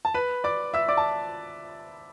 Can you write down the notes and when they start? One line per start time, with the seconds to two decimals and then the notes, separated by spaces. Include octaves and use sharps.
0.05 A5
0.14 B4 B5
0.44 D5 D6
0.74 E5 E6
0.89 D5 D6
0.97 A5